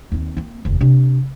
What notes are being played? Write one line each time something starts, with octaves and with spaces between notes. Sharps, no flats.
D#2 C4
A#3 C4
F1 D#2
C3 D4